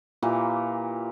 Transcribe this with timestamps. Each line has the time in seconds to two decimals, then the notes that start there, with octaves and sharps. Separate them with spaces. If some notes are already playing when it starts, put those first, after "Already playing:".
0.22 A#2 E3 G4 A#4